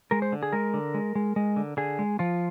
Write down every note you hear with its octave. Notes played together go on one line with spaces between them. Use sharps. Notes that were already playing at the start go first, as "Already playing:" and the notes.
G#3 A#4
C5
D3
G#4
G#3 A#4
D3
G#3
G#3
G#3
D3
D3 G#4
G#3
F3 F4